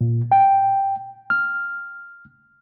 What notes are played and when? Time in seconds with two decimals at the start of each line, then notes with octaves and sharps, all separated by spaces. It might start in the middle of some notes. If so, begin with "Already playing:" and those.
0.01 A#2
0.32 G5
1.30 F6